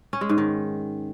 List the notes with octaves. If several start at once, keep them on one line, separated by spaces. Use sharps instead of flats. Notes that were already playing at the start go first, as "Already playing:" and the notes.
C#4
G#3
G#2
D#3